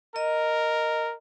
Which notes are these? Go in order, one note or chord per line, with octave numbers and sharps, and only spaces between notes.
A#4 D#5